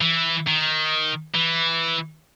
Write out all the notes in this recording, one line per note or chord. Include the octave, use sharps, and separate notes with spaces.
E3
D#3
E3